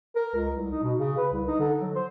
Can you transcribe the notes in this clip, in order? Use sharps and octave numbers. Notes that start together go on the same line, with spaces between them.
A#4
C#2
C2
D#4
B2
C#3
B4
C2
D#4
D3
F#3
C5